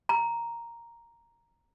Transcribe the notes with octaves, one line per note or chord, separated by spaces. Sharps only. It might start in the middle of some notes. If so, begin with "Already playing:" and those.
A#5